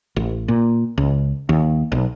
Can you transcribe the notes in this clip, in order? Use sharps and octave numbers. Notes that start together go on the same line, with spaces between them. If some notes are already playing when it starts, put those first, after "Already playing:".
A1
A#2
C#2
D#2
B1